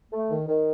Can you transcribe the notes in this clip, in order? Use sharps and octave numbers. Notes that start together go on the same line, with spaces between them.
A3
D#3
D#3